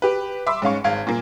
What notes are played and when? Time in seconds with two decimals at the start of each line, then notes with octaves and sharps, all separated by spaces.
0.02 G4 B4
0.46 E5 B5 C6 D6 E6
0.62 G#2 C#4 F5 C#6
0.84 G#1 F5 G#6
1.07 A#2 A#3